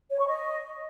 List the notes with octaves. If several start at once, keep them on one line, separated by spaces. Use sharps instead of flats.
C#5
C#6
D#5